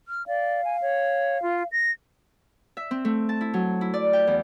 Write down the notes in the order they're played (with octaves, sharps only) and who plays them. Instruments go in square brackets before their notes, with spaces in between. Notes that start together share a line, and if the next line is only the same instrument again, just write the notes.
[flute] F6
[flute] D5 [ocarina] F5
[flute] G#5
C#5
F4
A#6
[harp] E5
C4
A3
A5
E4
F#3
E4
D5
G5
E2